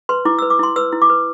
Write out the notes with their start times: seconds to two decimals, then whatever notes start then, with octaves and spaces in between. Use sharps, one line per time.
0.09 B4 C6
0.25 E4 D6
0.39 B4 E6
0.50 D6
0.59 E4 C6
0.76 B4 E6
0.92 E4
1.02 D6
1.10 B4